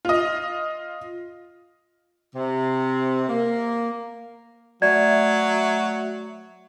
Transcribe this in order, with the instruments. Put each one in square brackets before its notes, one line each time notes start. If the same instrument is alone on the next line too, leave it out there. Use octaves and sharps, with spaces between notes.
[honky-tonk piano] F4 D#5
[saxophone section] C3
A#3
[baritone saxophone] F#3 [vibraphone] A3 E5 [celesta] D5 G#6